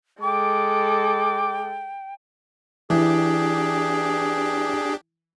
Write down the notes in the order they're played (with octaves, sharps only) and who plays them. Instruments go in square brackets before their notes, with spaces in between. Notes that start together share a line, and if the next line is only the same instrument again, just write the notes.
[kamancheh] G#3 A4 [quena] G5 [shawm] D6
[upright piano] E3 [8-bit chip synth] D4 G4 [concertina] G#4